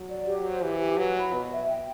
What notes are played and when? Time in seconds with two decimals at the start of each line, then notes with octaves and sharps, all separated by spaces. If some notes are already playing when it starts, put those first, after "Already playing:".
Already playing: F#3
0.09 D5
0.27 G4
0.44 C5
0.62 E3 G4
0.79 G4
0.97 F#3 B4
1.16 B5
1.33 B2 B4
1.51 E5
1.68 G5